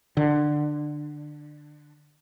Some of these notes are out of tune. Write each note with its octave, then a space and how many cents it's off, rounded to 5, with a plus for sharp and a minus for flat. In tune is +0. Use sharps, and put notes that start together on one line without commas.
D3 +20